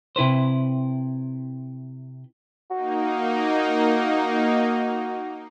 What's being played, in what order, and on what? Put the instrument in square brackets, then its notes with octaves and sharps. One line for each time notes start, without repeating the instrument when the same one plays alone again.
[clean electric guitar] C3 E4 B4 C5
[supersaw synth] A#3 D#4 [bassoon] F#4